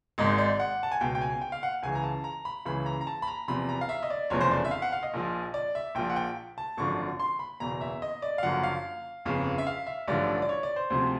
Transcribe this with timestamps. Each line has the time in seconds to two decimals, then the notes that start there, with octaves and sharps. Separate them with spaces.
0.18 G#1 G#2 D#3 D#5
0.38 D5
0.60 F#5
0.83 A5
0.91 G#5
1.01 C#2 B2 G5
1.15 G5
1.21 G#5
1.41 G5
1.52 F5
1.63 F#5
1.83 C#2 C#3 E3 G#5
1.95 A#5
2.04 A5
2.24 A#5
2.45 B5
2.65 C#2 C#3 E3 B5
2.86 A#5
3.01 A#5
3.07 A5
3.22 B5
3.27 A#5
3.48 E2 C3 F3 B5
3.69 A#5
3.81 F5
3.89 E5
4.03 D#5
4.10 D5
4.30 F1 E2 C#3 F3 C#5
4.41 C5
4.51 D5
4.65 E5
4.71 F5
4.82 F#5
4.92 F5
5.03 D#5
5.14 A#1 A#2 F3
5.54 D5
5.75 E5
5.95 A#1 A#2 F3 G5
6.10 F#5
6.16 G5
6.58 A5
6.77 G#1 F#2 D3 F3 C#6
7.20 C6
7.39 B5
7.60 F#1 E2 B2 A#5
7.81 E5
8.02 D#5
8.22 D5
8.38 F5
8.43 F#1 F#2 D3 F3 F#5
8.63 F5
9.25 G1 F2 C#3
9.58 E5
9.67 F5
9.87 E5
10.08 A1 G2 D3 F3 D5
10.42 D5
10.49 C#5
10.63 D5
10.76 C5
10.90 D2 C3 F3 C5